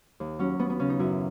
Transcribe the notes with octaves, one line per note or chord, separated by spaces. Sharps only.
D#2
F#3 C#4
D#2 B3
B3
C#3 C#4
D#4
F#2 E4